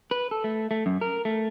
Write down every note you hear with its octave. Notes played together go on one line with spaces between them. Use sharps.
B4
A4
A3
A3
F#2
A#4
A3